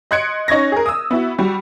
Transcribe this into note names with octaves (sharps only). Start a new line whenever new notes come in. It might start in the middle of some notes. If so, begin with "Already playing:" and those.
D#5 C6 F#6 G#6 C#7 D7
C#4 D#4 C#6 G#6 A#6
G#4 A#4
D#6 E6
B3 E4 F#4
G3 F#4